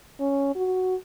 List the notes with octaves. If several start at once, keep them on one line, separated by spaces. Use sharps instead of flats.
C#4
F#4